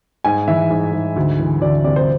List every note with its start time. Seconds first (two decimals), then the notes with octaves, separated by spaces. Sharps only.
0.24 G#2 G#5
0.48 E3 E5
0.70 G#2
0.93 G#2
1.16 D2
1.39 E3
1.61 D2 D5
1.84 C3 D5
1.96 C5